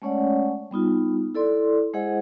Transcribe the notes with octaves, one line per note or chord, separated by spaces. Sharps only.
G#3 A3 C#4 C#5 D5 F#5
G3 B3 D#4 F4
E4 A4 D5 C6
G#3 E4 G#4 C5 D#5 F#5